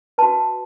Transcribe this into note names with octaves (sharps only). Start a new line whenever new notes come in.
F#4 B4 A5